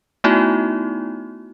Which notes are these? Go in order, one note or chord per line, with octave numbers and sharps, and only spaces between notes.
A3 B3 D#4 E4 F#4